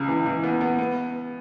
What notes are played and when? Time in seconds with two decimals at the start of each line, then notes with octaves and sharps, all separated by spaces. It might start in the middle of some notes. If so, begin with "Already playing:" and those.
Already playing: C#2 C#3
0.08 E3
0.26 E3
0.44 B3
0.61 B3
0.79 B3